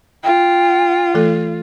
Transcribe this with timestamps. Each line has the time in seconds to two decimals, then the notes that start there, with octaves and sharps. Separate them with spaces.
0.24 F4 G5
1.14 E3 A3 A4